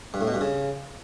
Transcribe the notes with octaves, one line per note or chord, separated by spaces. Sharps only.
G2
A2
B2
G2
C#3